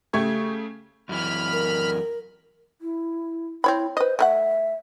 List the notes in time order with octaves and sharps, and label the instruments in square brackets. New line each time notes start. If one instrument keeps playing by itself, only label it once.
[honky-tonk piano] C#3 A3 G4 C#6 G#6
[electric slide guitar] F#2 E3 [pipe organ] B5 F6
[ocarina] A#4
[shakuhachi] E4
[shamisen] C4 C#5 B5 [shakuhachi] E4
[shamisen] B4 D#5 [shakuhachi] C5
[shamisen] A3 A#4 F#5 [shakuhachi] E5